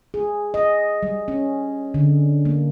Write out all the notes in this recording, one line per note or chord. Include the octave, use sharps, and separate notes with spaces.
G#4
D#5
G3
C#4
D3
A#3